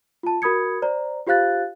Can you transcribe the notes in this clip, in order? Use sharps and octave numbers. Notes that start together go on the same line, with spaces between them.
F4 A5
F#4 A#4 B5 D#6 G#6 C#7
C5 D5 A#5
F4 G4 C5 F5 F#6 A6